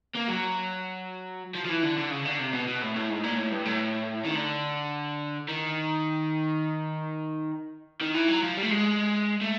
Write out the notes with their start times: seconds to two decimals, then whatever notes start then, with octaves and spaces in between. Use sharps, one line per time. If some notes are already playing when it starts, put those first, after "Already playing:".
0.15 A#3
0.28 F#3
1.55 F3
1.65 F3
1.69 E3
1.83 D3
1.98 D3
2.11 C#3
2.25 D3
2.39 C3
2.53 B2
2.68 B2
2.82 A2
2.95 A2
3.10 G#2
3.23 A#2
3.37 A2
3.51 G2
3.66 A2
4.24 D#3
4.35 D3
5.48 D#3
8.01 D#3
8.15 E3
8.28 F#3
8.43 F3
8.57 G3
8.63 A3
8.71 G#3
9.41 A3